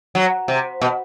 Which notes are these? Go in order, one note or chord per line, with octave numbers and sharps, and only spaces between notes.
F#3
C3
B2